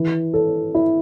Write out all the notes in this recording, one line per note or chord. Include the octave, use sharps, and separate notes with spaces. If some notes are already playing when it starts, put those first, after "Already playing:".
Already playing: E3
A4
E4